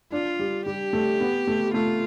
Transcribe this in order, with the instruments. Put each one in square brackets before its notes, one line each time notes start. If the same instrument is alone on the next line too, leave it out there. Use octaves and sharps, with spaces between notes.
[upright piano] D4 [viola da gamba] F4
[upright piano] G3
[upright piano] G3 [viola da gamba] G4
[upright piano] A3
B3
A3
[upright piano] A3 [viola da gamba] F4